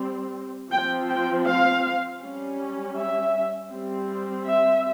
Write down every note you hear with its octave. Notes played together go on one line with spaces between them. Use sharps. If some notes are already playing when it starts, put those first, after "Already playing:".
Already playing: G3 C4
F3 C4 G5
G5
F5
G3 C#4
E5
G3 C4
E5